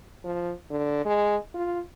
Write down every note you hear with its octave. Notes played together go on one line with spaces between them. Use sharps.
F3
D3
G#3
F4